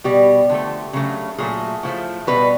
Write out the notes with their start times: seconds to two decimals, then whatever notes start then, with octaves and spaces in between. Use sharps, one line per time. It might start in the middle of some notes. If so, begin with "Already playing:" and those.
0.04 B2 G3 G4
0.49 D3 F3 A3
0.93 C#3 F#3 A3
1.38 A#2 F#3 A3 G#4
1.83 A2 F3 A3
2.27 B2 G3 B4